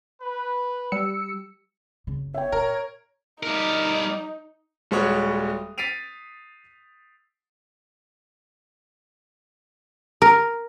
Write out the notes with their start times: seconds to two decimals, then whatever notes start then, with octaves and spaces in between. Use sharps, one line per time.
0.22 B4
0.92 G3 E6 C#7
2.07 F#1 C#3
2.34 C#5 E5 G5
2.52 A#2 A#4
3.43 G3 D#4 A#4
4.91 D#1 G3 G#3 F#4 C#5 D#6
5.78 A6 B6 C7 D7 D#7 F7
10.22 A#4